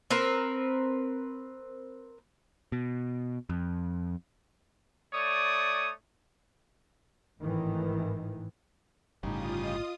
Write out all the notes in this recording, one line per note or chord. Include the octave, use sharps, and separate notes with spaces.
C4 A#4 B4
B2
F2
A3 C#5 D5 D#6
G#1 A2 D#3 E3
G1 A2 C#3 G3 D#4 F4 D#6
D#5